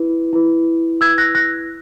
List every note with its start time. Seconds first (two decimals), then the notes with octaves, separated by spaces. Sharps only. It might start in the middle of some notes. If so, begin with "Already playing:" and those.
Already playing: E4 B4
0.33 E4 B4
1.01 E4 B4 E6 G#6
1.18 F#6 A#6
1.35 F#6 A#6